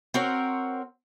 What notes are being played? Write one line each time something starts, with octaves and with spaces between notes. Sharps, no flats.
C4 F#4 A#4 C#5